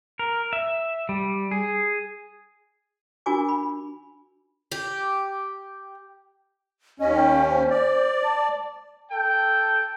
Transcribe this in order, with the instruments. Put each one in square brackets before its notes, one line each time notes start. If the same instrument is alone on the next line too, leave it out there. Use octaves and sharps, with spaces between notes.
[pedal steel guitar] A#4
E5
G3
G#4
[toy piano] D4 F4 F#4 A#4 G#5 D6
B5
[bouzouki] G4
[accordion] D#2 C#4 [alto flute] D#5
[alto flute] G5
C5
[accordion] D5
[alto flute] A5
[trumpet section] A4 G5